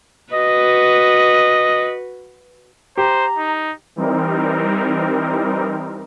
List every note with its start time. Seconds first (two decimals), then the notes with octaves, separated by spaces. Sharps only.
0.33 F#4 B4 D#5
2.97 G4 C5 A#5
3.38 D#4
3.96 E3 G3 C4 D#4 A#4